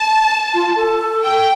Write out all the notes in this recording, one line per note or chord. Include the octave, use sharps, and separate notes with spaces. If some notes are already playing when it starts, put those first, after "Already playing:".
Already playing: A5
F4
A4
G5